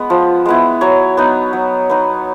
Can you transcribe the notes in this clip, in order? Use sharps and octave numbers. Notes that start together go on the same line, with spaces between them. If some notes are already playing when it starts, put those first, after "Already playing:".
Already playing: G#3 B3
F3
G#3 B3 E4
F#3 C#5
B3 D#4
F#3
B3 D#4